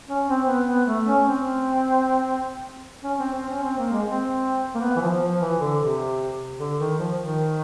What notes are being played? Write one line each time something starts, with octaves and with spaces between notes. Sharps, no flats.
C#4
C4
B3
B3
A3
C#4
C4
C#4
C4
C4
C#4
C4
A#3
G#3
C4
A#3
B3
E3
F3
F3
E3
D3
C3
D3
D#3
F3
D#3